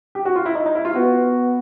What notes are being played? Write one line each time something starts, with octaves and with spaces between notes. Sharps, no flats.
G4
F#4
F4
E4
D#4
D#4
E4
F4
B3 F#4